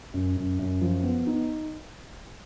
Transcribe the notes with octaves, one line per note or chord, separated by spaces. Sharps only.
F#2
F#2
F#2
F3
B3
D#4